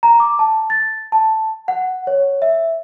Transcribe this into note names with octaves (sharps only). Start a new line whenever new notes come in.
A#5
D6
A5
A6
A5
F#5
C#5
E5